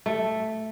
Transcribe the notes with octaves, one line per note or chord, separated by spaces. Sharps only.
A3